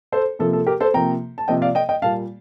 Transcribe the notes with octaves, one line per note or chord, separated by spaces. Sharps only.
A4 C5
C3 F3 A#3 A4
A4
G4 A#4
A4 C5
C3 F3 A#3 G5 A#5
A5
C3 F3 A#3 D#5 G5
D5 F5
D#5 G5
D#5 G5
A#2 G3 A#3 F5 A5